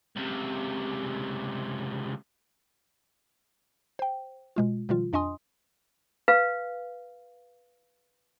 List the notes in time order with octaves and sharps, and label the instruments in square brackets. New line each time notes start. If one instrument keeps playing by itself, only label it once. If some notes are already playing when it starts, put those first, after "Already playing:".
[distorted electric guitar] C#2 C3
[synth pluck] C5 G5
B2 G#3 F4
B2 D#3 F3 G3 F4
F2 D4 D#5 G#5 C6 D#6
[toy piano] B4 F5